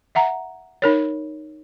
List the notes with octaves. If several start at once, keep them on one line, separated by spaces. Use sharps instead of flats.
E5 F#5 A#5
D#4 A#4 C#5